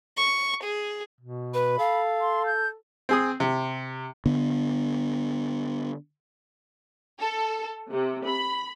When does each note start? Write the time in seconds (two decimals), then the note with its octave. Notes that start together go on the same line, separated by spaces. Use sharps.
0.18 C#6
0.64 G#4
1.21 B2
1.54 B4 B5
1.79 A4 F5
2.21 C6
2.46 G6
3.09 C4 G#4 D#6
3.40 C3
4.26 D3 B3
7.20 A4
7.91 C3
8.26 B5